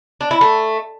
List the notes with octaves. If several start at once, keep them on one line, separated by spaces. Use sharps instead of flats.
D4
E4
A3